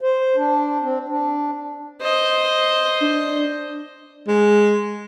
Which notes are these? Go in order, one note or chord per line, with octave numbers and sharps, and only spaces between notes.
C5
D4
C4
D4
C5 D#5
D4
G#3